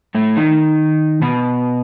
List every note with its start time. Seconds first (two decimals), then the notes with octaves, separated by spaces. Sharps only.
0.15 A2 A3
0.37 D#3 D#4
1.22 B2 B3